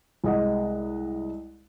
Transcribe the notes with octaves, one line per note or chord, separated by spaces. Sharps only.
C2 G#3 D#5 F#5